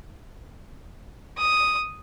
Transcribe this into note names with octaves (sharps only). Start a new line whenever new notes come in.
D#6